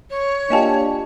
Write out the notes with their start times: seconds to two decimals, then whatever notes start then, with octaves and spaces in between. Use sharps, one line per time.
0.10 C#5
0.50 A#3 D4 F4 G4 D#5 G#5 A5